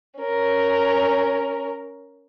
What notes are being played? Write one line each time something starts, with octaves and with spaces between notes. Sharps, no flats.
C#4 A#4